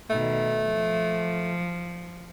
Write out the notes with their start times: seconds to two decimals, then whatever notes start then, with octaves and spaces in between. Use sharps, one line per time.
0.10 B2 D#3 A3
0.65 F3